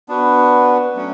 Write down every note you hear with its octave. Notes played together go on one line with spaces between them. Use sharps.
B3 D4 F#4 B4
F#3 A3 C#4